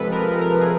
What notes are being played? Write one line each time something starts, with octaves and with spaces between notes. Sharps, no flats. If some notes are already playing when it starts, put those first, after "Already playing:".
Already playing: C3 F3 G#3 A4 B4
C3 A#4
G#3
A#4
F3
G#4